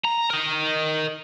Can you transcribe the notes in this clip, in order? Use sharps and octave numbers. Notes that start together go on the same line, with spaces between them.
A#5
A#4 D#5